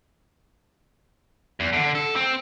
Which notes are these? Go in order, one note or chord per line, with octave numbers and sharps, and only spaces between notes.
E2
D3
A4
C4